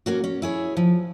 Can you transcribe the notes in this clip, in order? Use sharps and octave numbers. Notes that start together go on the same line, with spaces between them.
A#3 C#4 F#4
C#4
E4 G#4 C#5
F3